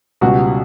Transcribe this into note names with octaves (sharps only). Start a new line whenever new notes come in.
C#2 B2 G3 F#4